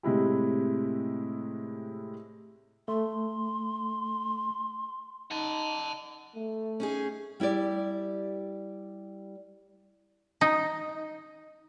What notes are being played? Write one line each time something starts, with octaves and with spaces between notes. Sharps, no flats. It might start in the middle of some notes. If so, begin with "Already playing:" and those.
A2 C3 G#3 E4 G4
A3 C6
D#4 F#5 A5
A3
C#4 D#4 G#4
G3 E4 G4 D5
D#4